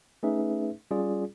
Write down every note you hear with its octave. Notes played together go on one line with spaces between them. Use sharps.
A3 C#4 D#4 G#4 B4 E5
G3 C#4 F4 G#4 D5